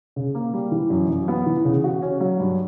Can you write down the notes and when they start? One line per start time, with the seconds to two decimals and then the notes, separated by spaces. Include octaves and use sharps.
0.16 C#3
0.35 A#3
0.53 G3
0.72 E3
0.90 F#2
1.09 F#2
1.28 B3
1.46 E3
1.65 C#3
1.84 F#4
2.02 C#4
2.21 F#3
2.40 G2